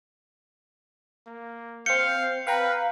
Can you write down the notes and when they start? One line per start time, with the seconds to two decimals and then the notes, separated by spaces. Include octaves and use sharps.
1.27 A#3
1.86 C4 F5 G6 C#7
2.47 B4 F5 G5 A#5